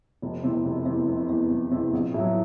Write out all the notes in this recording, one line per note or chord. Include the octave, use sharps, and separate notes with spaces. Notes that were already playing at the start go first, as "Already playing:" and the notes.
F1
E2 C3
F1
E2 C3
F1
E2 C3
F1
E2 C3
A#1
A2 F#3